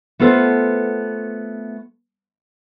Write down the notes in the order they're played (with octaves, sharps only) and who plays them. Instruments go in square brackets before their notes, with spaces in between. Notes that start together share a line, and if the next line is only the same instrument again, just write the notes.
[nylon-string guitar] A3 B3 F4 A4 C5